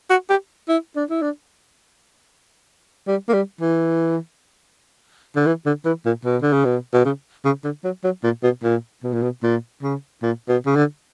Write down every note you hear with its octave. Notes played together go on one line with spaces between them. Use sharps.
F#4
G4
E4
D4
E4
D4
G3
A#3
G3
E3
D3
E3
D3
E3
A#2
B2
D3
C#3
B2
B2
C#3
C#3
D3
F#3
F#3
A#2
B2
A#2
B2
A#2
B2
A#2
C#3
A#2
B2
C#3
D3